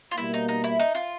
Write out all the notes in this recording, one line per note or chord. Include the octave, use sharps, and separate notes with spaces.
F4
B2 G3 A#3 E4
D#4
D#4
E4
D#4
F4